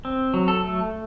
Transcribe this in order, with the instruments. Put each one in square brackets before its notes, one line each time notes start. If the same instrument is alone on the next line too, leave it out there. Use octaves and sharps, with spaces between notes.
[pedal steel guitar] C4
F#3
A4
A3